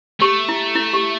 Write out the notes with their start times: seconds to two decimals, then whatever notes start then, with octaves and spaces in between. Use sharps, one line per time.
0.20 A3 G4
0.49 E4
0.75 E4
0.94 G4